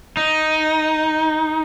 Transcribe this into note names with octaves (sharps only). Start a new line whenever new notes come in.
D#4